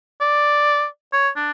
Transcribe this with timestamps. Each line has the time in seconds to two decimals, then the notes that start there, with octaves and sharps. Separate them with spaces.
0.21 D5
1.13 C#5
1.37 D4